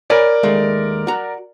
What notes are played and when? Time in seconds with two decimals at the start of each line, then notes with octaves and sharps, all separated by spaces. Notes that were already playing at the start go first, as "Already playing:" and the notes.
0.10 A#4 C#5 D5 G#5 B5
0.43 D#2 G#3 A3
1.07 F#4 A#5